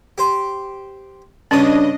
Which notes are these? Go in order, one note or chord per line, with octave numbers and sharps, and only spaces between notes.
G4 C5
G2 C#3 C#4 D4 D#5 D#6